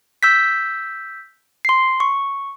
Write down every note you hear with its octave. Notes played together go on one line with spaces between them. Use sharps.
E6 G6 B6
C6 C7
C#6